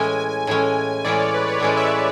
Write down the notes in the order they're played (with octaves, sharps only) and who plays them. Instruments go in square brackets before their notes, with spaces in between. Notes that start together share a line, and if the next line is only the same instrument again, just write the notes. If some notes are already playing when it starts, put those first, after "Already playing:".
Already playing: [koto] A2 E3 G#3 C#4 [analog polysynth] G#5
[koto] A2 E3 G#3 C#4
[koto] A2 E3 G#3 C#4 [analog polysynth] D5
[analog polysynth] C#5
B4
C#5
[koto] A2 E3 G#3 C#4 [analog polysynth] D5
[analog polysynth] E5
E5